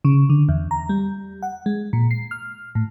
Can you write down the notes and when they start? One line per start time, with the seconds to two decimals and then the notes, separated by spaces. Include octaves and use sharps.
0.05 C#3
0.30 D3
0.49 E2
0.71 A#5
0.89 G3
1.43 F#5
1.66 G#3
1.93 A#2
2.11 C7
2.31 F6
2.75 A2